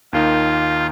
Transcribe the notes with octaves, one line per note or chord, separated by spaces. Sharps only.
D#2 D#3 A#3 D#4 F4